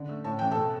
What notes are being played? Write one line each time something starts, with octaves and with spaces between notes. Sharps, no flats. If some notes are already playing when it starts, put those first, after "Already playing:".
Already playing: D3
A3
A2 A5
E3 A3 G5
A4 A5
B2